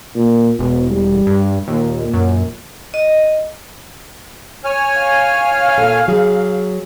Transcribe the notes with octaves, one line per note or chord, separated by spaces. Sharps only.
A#2
E1 B2
G3
G2
D#2 A#2
F#2
D#5
C#5 G#5 F6
F5
A#2 A4
F#3 G#4